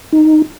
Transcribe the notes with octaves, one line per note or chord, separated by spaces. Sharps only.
D#4